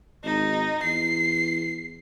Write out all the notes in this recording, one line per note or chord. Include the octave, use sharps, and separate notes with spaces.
G#1 D#4
E2 C7